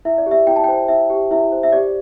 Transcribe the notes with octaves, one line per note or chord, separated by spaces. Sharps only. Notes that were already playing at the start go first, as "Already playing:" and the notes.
E4 E5
D5
G4
E5
E4 G5
A5
C5 G5
E4 E5
G4
E4 E5
C5
E5
G4 D5